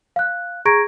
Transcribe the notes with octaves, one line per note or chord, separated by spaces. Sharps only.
F5 F#6
G#4 A#5 C#6 G#6 A#6 D7